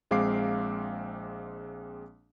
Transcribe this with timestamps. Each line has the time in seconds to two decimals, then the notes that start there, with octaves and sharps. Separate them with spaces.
0.11 A#1 G#3 C4 F5 D6 C7